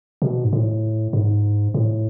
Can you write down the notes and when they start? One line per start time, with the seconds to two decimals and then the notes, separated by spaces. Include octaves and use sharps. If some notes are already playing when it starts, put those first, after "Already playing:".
0.22 B2
0.44 G#2
0.53 A2
1.13 G#2
1.74 A2